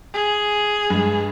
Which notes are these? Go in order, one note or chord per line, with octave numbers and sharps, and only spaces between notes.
G#4
G2 G#3